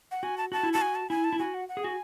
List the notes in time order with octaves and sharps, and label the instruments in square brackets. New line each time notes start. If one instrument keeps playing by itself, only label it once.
[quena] F#5
[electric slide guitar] F#4 [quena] G#5
[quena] A5
[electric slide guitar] F#4 [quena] A5
[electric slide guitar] E4
[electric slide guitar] F#4 [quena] A5
[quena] G#5
A5
[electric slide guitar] E4 [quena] G#5
[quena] A5
[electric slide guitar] E4
[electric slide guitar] F#4 [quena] G#5
[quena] F#5
F#5
[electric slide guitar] G#4
[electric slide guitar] F#4 [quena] G#5